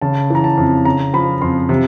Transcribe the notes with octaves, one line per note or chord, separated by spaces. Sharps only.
C#3 A5
E3 A#5
A5
F2
C#3 A#5
F3 B5
F2 C6
C3